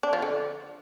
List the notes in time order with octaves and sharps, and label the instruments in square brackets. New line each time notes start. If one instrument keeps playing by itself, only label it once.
[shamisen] D4
F3
D3